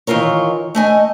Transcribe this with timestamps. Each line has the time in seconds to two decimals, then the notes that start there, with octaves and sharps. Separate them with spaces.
0.07 D#3 E3 F4 A#4 C#5
0.75 A3 D#5 G#5